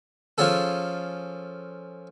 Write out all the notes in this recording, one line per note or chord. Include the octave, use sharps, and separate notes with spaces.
F3 C#4 F4 G#4 A4